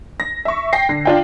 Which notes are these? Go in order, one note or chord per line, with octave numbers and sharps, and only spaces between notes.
A#6
E5 C#6
G5 A#6 C7
D3
D4 F4 G5